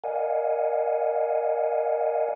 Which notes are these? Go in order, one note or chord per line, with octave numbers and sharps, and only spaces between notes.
A#4 D5 D#5 F5 F#5 G#5